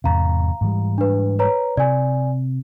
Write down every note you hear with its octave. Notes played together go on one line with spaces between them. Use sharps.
E2 G#2 C3 F5 A#5
G#2 E3 G3
D4 B4
B4 C#5 A#5
C3 D5 G#5